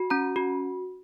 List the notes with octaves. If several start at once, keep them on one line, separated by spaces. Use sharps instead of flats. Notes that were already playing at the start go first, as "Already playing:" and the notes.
Already playing: F#4
C#4 A#5
F#4